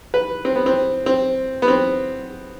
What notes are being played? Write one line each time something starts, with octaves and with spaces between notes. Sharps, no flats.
B4
C4
B3
C4
C4
B3
C4